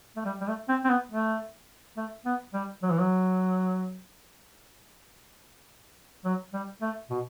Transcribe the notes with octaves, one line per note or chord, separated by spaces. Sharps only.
A3
G3
G3
A3
C4
C4
B3
A3
A3
B3
G3
F#3
E3
F#3
F#3
G3
A3
B2